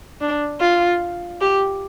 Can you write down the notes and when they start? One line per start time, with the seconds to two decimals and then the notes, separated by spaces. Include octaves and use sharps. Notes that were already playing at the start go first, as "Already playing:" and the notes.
0.21 D4
0.61 F4
1.41 G4